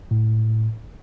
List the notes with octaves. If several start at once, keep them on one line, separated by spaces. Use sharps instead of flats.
A2